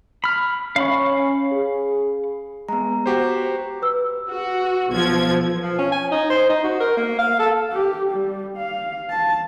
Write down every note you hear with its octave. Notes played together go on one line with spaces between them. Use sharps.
B5 F6
C#4 F5 B5 C#6
G#4
G#3 B3 A#5
F#4 G4 C5
B4 E6
F#4
B1 F3 G#6
F3
C#4
G#5
D#4
C5
D#4
F#4
A#4
A#3
F5
A4
G4
G3
F5
A5